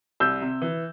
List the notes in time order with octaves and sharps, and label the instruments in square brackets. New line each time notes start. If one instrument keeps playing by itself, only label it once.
[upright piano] C2 [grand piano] E6 G6
[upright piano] C3
E3